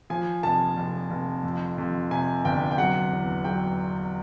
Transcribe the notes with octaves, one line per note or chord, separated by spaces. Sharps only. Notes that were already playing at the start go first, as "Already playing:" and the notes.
F3 G#5
F1 A5
F1
F1
F2
F2
C3 G#5
G1 G5
G5
F#3 F#5
E2
F#3 G5